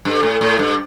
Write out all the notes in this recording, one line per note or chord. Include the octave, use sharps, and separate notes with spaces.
G2 A4
A2
A2
G2